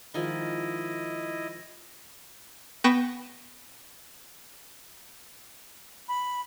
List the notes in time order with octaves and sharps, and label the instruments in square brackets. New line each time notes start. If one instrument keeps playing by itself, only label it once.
[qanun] D#3 F3 G#3 [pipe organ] E4 D#5
[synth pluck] B3 B4 G5 C#6 A#6 E7
[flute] B5